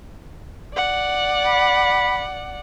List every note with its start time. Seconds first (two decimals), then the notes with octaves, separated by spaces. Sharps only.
0.74 D5 F#5
1.46 B5